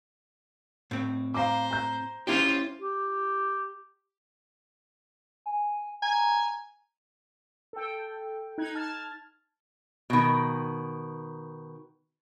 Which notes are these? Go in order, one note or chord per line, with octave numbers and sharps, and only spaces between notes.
A2 C4
C5 F5 A#5 D6
A#5 G6
C#4 E4 F4 G4 C5
G4
G#5
G#5 A#5
A4 G5
D#4 F#6 G#6
A5 F6 G#6 A6
B2 D#3